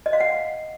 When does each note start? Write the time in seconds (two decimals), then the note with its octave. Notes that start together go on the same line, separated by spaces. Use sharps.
0.06 D#5
0.13 F5
0.20 F#5